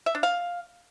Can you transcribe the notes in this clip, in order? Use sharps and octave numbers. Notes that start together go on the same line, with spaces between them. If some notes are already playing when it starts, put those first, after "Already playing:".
E5
D4
F5